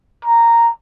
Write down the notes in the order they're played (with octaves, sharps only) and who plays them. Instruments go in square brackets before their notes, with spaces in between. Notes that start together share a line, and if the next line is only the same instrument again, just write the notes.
[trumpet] A#5